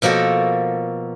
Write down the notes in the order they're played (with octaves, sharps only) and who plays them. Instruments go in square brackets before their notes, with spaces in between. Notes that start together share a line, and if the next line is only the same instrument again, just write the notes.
[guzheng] B2 F3 A#3 F#4 A4